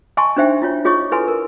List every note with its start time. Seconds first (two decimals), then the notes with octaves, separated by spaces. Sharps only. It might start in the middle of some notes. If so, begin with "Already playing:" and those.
0.17 D#5 G#5 A5 C6 C#6
0.37 D4 D#4 C5 E5 G5
0.62 E4 F4 C#5
0.85 F4 G#4 C#5 D#5 C#6
1.12 E4 A4 B4 G#5 C6
1.28 A#4